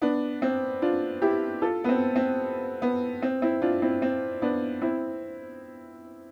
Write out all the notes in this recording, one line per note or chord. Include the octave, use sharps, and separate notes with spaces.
B3 D4
C4
D4 F4
E4 G4
F4 A4
B3
C4
C4
B3
C4
C4 E4
D4 F4
C4 E4
C4
B3 D4
C4 E4